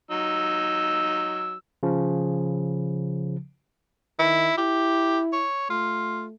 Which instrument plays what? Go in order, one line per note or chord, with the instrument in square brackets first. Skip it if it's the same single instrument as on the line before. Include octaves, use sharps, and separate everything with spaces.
[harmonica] F#3 D#4 E6
[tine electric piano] C#3 F3
[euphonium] D#3 [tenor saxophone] E4
[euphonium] E4 [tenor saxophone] G4
[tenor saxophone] C#5
[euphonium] A3 [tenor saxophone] F4